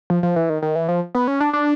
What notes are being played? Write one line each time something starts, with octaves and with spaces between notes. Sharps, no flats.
F3
F3
E3
D#3
D#3
E3
F3
B3
C#4
D4
D4